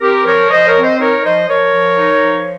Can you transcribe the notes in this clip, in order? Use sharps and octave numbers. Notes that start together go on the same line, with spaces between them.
C4 G4 A#4
F3 A#4 C#5
F3 C5 D#5
A#4 C#5
C4
C5 D#5
D#4 A#4 C#5
F3 C5 D#5
F3 A#4 C#5
F3
D#4
F3